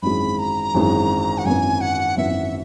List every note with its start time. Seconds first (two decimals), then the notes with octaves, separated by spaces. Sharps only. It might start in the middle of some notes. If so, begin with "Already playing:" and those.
0.02 G#1 F#2 E3 G#3 B5
0.39 A#5
0.74 G#1 F#2 E3 G#3
1.38 F#5
1.45 G#1 F#2 E3 B3 G#5
1.81 F#5
2.17 G#1 F#2 E3 B3 E5